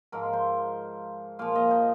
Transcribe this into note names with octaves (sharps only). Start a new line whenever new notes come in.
G#2 F3 A#4
C5
A#2 F3 F5
D#5
D#4